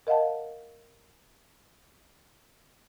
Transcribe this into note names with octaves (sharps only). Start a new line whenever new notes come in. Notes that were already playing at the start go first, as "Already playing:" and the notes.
A#4 D#5 F5 F#5 A5